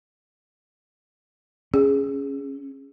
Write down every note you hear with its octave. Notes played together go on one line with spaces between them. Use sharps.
C#4 G#4